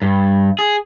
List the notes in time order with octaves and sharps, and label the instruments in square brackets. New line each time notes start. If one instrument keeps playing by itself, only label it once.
[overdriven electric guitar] G2
G#4